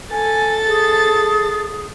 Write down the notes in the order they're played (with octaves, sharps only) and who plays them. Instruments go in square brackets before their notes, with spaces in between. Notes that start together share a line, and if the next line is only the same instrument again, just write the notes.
[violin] A4 A6 [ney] G#5
[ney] G#4